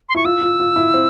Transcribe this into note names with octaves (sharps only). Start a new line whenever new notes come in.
C6
E4 C#6
F4 E6
F4
F4
E4
C4